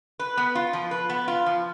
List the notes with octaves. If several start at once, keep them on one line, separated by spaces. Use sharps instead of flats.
B4
B3
F4
F3
B4
B3
F4
F3